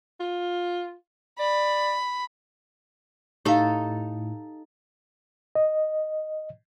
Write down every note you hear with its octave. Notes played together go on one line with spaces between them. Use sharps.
F4
D5 B5
A2 D#4 G4 A4 F5
D#5